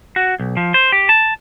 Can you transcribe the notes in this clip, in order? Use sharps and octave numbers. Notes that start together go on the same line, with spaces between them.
F#4
B1
F3
C5
G4
A5